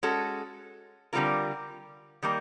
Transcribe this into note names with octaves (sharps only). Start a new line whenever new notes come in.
G#3 C#4 F#4 A4
D3 G3 C4 F4 A#4
D#3 G3 A#3